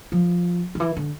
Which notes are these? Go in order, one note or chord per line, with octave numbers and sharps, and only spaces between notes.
F3
D#3
E3
D3